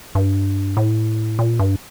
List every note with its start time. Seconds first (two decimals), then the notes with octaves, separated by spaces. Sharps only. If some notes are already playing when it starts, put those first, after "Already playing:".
0.15 G2
0.77 A2
1.39 A#2
1.59 G2